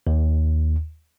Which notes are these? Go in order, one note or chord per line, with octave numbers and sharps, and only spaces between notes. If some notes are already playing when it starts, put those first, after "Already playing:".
D#2